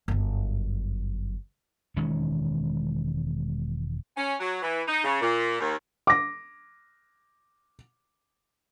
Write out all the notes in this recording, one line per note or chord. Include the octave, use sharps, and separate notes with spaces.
G1 F#2
E1 D#3 G#3 C#4
C#4
F#3
E3
D#4
C#3
A#2
D#2
D6 A#6